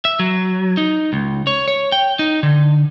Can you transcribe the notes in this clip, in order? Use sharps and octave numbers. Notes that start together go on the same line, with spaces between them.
E5
F#3
D#4
C#2
C#5
C#5
G5
D#4
D3